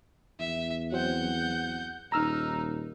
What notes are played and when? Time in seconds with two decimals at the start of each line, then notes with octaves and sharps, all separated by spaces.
0.40 E2 E5
0.92 F#3 C4 F#5 G6
2.12 D#1 D#4 A#5 E6 F6